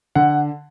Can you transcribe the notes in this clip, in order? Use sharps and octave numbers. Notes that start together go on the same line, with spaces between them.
D3 F#5